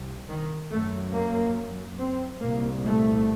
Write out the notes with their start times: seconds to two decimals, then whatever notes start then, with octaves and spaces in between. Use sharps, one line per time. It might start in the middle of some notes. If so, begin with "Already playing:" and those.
Already playing: C2 C3
0.29 D#3
0.71 F#2 A3
1.14 A#3
1.98 C4
2.40 C2 A#2 A#3
2.84 A3